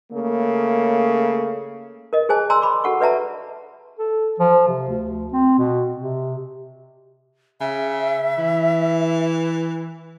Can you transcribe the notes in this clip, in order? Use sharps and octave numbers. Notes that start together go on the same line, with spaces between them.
C#3 A3 A#3
A#4 D#5
G#4 C5 G#5 A5
D5 G#5 A#5 C6 E6
B5 D6
F#4 A4 F#5 C#6
B4 D5 E5 A5 A#5
A4
F3
C3
D2
C4
B2
C3
C#3 E5
E3